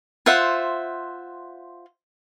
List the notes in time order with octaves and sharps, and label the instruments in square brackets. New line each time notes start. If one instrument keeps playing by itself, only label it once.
[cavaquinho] F4 C5 E5 F#5